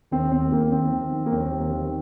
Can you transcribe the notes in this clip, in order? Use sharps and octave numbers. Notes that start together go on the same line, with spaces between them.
D#2 C4
D#2 C4
D#2 A#3
D#3 C4
D#3
D#3
A#3
D#2 C4
G3
D#3